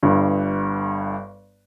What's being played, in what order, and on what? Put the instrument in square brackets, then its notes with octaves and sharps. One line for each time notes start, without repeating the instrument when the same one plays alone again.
[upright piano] G1 G2